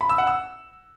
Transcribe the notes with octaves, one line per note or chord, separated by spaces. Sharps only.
B5
E6
F#5
E6